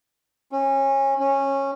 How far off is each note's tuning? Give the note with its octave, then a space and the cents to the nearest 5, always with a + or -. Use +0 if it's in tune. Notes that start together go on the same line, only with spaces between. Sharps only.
C#4 -25
C#4 -15